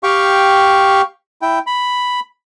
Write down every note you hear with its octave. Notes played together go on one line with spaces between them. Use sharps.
G4 F5 G5 C#6
E4 G5
B5